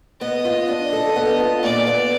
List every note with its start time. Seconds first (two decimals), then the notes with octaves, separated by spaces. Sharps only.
0.21 B3 D#5
0.45 F4
0.68 D4
0.93 A4
1.16 B3
1.40 F4
1.63 A#2 D5
1.87 B3